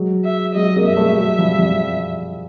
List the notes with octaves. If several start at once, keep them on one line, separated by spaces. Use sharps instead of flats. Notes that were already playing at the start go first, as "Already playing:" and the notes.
Already playing: F#3 G#3
E5
F#3 G#3 D#5
G#3 A#3
E5
G3 A3
F#3 G#3
F3 G3
F3 G3